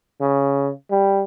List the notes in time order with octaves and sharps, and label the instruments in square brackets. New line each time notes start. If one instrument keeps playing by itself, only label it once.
[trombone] C#3
G3